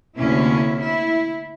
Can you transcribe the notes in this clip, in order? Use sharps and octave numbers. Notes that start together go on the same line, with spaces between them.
D2 C3 A#3 C#4 E4
E4